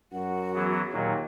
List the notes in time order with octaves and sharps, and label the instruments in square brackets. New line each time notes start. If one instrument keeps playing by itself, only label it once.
[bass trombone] F#2 [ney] F#4 [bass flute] F#5
[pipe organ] E3 F#3 B3 [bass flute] G#4
[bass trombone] D#2 [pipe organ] A#2 F#3